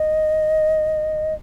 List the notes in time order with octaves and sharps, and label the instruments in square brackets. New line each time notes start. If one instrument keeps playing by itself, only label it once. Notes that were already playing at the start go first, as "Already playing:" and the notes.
Already playing: [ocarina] D#5